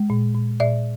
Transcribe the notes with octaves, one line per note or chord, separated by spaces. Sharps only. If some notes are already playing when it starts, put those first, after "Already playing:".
Already playing: G#3
A#2
A#2
A#2 D5 E5